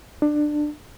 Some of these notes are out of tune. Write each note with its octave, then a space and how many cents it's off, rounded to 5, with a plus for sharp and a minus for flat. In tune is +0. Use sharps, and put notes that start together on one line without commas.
D4 +20